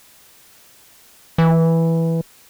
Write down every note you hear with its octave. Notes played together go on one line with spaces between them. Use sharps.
E3